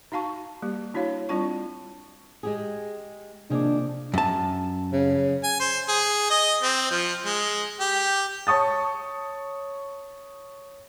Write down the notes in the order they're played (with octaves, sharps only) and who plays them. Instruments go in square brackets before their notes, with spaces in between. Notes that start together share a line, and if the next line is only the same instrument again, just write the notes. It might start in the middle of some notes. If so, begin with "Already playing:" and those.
[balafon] D#4 F#4 F5 A5 C#6
G3 A#3 G4
D4 E4 F#4 C#5 F5
G3 C4 D4 F4 A5 C#6
[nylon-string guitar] G#3 G4 G#4
[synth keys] C3 A#3 D6 [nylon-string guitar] D#3 F3 G#4 [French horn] D4
[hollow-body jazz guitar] F#2 A5
[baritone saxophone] C#3
[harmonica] G#5
C5
G#4
D#5
C4
F3
G#3
G4
[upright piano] C#5 A5 C#6 D#6 A6